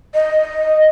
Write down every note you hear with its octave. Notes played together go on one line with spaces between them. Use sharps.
D#5